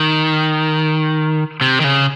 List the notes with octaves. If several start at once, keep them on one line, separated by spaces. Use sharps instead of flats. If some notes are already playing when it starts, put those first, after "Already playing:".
Already playing: D#3
C3
D#3
C#3